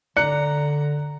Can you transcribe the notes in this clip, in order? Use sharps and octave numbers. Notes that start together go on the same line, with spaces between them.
D3 D5 A#5 F#6 C#7